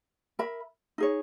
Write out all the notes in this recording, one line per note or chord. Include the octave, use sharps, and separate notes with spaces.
A#4 E5 B5
D#4 G#4 C#5